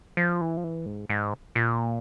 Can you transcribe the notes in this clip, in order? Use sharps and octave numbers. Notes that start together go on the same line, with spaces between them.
F3
E3
F3
E3
G#2
G#2
A#2